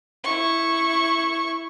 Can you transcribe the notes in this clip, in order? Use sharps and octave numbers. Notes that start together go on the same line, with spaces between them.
E4 C#6